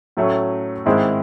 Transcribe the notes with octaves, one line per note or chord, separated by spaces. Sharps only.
A2 F#3 A3 C#4
G#2 D#3 G#3 C4 E4